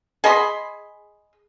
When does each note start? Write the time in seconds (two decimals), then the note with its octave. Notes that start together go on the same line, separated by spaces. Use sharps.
0.24 G#4 D#5 B5 C6